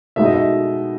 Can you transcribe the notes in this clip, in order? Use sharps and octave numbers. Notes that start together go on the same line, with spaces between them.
B2 G#3 D#4 E5
D#5
E5